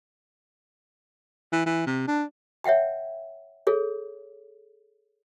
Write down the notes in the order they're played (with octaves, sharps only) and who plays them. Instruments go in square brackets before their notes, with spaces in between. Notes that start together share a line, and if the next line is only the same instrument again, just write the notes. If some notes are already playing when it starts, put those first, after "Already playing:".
[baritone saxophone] E3
E3
C3
D4
[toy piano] C#5 E5 F#5 G5 A5
G#4 A4 C#5